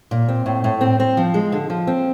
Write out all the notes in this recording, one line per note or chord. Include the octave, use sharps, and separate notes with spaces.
A#2
C4
A2
A2
C4
C4
F3
G#3
D3
F3
C4